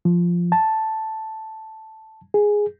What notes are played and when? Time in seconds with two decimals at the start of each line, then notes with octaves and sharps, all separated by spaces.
0.05 F3
0.52 A5
2.34 G#4